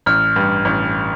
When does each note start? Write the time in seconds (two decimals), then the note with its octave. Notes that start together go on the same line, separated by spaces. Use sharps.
0.06 A1 F6
0.36 G2
0.65 A1